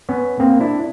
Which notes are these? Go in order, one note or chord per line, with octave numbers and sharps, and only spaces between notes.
B3 C#4
A#3 C4
D4 E4